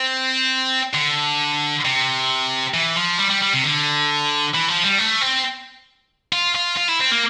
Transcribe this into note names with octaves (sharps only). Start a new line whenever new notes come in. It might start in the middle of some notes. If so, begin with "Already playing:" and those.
Already playing: C4
D3
C3
E3
F3
G3
G3
G3
C3
D3
E3
F3
G3
A3
C4
F4
F4
F4
E4
C4
A#3